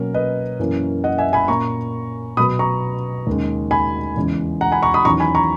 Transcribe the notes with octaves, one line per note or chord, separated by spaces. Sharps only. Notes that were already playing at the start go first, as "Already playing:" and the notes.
Already playing: B2 F#3 A#3 C#4 A#4 C#5
B4 D#5
F#2 E3 A#3 C#4
D#5 F#5
E5 G#5
G#5 B5
A#2 A#3 C#4 A#5 C#6
B2 F#3 B3 B5 D#6
A#5 C#6
D#2 C#3 G#3
G#5 B5
E2 C#3 G#3
F#5 A#5
G#5 B5
A#5 C#6
B5 D#6
E2 D#3 F#3 C#4 A#5 C#6
G#5 B5
A#5 C#6